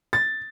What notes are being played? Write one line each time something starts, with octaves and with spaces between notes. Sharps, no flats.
A6